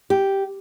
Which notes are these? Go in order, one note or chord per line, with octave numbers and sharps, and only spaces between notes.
G4